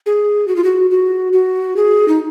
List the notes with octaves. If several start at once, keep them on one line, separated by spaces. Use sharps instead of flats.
G#4
F#4
F4
F#4
F#4
F#4
G#4
D#4